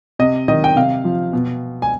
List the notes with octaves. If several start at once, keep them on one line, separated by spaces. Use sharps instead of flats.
C3 D#5
D#3 D#5
G5
C3 F5
F3
B2
G#5